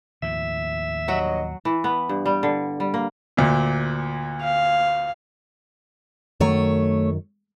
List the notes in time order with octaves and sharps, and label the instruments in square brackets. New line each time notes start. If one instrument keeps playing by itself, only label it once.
[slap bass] D#2 A2 F3 [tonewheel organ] E5
[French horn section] G2 C#5 D#5 [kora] F#3 F#4
[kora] E3
B3
G2
G3
D3
G3
A#3
[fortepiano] D2 A#2
[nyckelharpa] F5
[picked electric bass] F#2 D#3 [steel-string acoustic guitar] A3 C#5